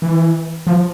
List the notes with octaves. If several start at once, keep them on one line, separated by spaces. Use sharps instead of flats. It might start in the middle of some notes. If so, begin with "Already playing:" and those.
E3
F3